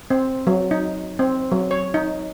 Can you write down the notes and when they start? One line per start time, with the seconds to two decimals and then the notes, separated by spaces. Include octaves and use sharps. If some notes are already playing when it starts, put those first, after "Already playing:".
0.10 C4
0.47 F#3
0.71 D#4
1.19 C4
1.52 F#3
1.71 C#5
1.94 D#4